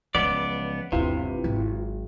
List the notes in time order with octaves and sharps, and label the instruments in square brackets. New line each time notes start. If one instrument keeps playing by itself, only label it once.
[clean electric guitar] C#2 B3 D5 [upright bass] F3 F#3
[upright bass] G1 D#2 [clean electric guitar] C3 [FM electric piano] E4 F4 B4
[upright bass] G#1 F#3